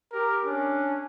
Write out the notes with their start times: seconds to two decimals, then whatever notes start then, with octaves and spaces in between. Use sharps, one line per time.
0.12 G4 A#4
0.45 C#4 D4